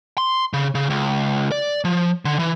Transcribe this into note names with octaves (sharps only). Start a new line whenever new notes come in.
C6
C#3
C#3
C#2
D5
F3
D3
E3